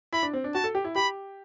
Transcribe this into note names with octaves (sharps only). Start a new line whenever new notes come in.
E4 B5
D4
C4
D4
F#4 A5
A4
G4
E4
G4 B5